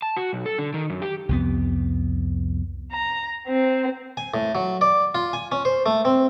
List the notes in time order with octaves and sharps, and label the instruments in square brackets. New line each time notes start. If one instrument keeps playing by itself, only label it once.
[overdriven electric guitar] A5
F#4
B1
A4
D3
D#3
F#2
G4
[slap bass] C2 F2 B3
[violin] A#5
C4
[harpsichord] G#5
A2
F#3
D5
F4
G#5
C#4
C5
A3
C4